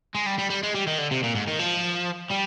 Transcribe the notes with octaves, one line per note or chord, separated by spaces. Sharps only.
G#3
G3
G3
G3
G#3
G3
D#3
D3
C3
A#2
G#2
D#3
F3
G3